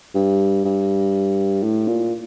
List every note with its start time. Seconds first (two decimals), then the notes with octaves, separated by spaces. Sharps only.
0.15 G2
0.65 G2
1.63 A2
1.88 A#2